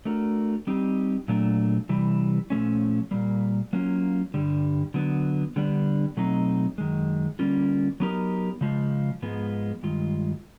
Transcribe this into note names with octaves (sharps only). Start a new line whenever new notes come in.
A3 D4 F#4 A#4
G3 C4 D#4 G4
A#2 F#3 A3 D4
C3 E3 G3
A#2 F3 A3 C#4
A#2 G3 A#3
F#3 A#3 C#4 F4
G2 D3 G3
D3 F#3 B3
D3 G3 B3 D4
B2 F#3 A3 C4 D#4
F#2 D#3 G#3
D3 G3 A#3 C#4 F4
F#3 B3 D#4 G4 A#4
C#3 F3 G#3
G#2 F3 G#3 B3
G2 D#3 G#3 F4